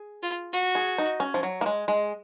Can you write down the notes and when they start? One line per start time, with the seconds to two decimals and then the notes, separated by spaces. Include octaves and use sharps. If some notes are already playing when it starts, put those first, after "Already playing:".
Already playing: G#4
0.23 F4
0.53 F#4
0.75 G#4
0.98 D#4
1.20 C#4
1.34 F3
1.43 F#3
1.61 A#3
1.66 G#3
1.88 G#3